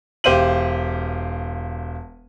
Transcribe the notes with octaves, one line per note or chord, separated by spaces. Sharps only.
E1 G4 C5 F5 D#7 F#7